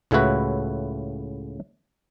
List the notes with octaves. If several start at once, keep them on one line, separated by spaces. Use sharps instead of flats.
C#2 A2 C#3 E4 F#4 B4